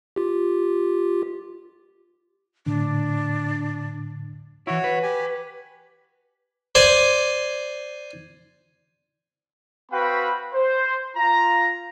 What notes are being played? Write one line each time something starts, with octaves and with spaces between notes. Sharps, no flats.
F4 G4
A2 D3 D4
E3 E4 F#4 C#5
B4
G4 G#5
C5 D5 G#5
C4 F#4 B4 F5 G5 B5
C5
F4 A#5